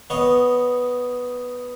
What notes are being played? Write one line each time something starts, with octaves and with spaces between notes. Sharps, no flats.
B3 C#5 D#5